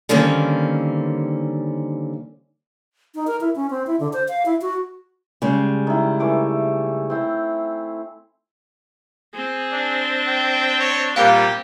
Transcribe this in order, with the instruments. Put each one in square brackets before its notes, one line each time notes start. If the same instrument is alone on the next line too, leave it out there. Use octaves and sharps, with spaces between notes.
[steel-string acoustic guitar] D3 D#3 G3 A#3 C4 C#4
[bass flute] D#4
A#4
E4
C#4
C4
E4
D3
C5
F5
E4
F#4
[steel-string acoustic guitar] C#3 G3 G#3
[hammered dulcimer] D#3 E4
E3 A3 D6
C4 E4
[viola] C4 [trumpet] G#4
[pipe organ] D4
[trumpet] G5
C#5
[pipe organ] A#2 G3 [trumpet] G4 [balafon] A#4 F5